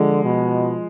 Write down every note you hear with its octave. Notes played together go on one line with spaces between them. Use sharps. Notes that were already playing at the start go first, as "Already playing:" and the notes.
Already playing: D3 F3 G#3
B2